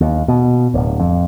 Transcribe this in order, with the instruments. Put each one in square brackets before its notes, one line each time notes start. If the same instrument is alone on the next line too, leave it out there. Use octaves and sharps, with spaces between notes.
[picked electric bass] D#2
B2
D1
F2